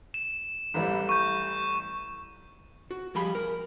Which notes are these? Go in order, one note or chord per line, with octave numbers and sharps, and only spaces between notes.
E7
A1 E3 G3
C#6 G6
F#4
F3 G3 G4 G#4 B5
A#4